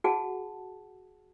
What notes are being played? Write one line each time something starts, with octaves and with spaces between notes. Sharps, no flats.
F#4 G#4 F#5 A5